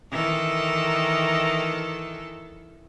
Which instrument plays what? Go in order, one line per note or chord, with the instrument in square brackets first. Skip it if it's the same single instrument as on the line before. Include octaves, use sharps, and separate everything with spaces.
[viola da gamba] D#3 E3 A4